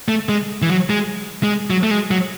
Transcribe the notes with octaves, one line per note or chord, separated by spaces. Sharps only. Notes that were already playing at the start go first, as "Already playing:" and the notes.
A3
G#3
E3
F#3
G#3
G#3
F#3
A3
G#3
F#3